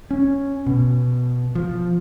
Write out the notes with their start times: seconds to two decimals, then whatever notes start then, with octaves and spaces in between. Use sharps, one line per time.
0.11 C#4
0.66 B2
1.55 F3